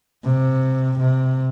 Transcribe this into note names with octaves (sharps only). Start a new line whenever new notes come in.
C3
C3